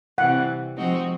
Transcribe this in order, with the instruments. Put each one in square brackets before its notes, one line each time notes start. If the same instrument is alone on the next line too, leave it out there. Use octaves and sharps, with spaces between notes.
[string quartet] C3 E3 G3 C4 [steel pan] F#5
[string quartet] F3 G#3 C4 D#4 F#4